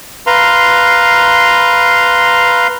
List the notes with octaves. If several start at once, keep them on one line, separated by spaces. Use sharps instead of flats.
B4 F5 A#5 C6